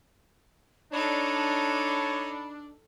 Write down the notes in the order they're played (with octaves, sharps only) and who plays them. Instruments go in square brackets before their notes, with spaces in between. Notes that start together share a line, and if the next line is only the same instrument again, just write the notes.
[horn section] D4 [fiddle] D#4 A4 [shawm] C#5 [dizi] B5